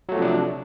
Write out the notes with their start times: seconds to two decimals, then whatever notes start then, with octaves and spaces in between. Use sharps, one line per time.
0.09 F#3
0.12 A3
0.15 F3
0.18 C3
0.22 D4